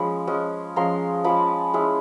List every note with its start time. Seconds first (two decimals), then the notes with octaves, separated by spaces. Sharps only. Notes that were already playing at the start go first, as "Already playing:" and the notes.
Already playing: F3 G#3 C#4 B5
0.27 F3 G#3 C#4
0.76 F3 G#3 C#4 A#5 C6
1.24 F3 G#3 C#4 A5 B5
1.74 G#3 C#4 E4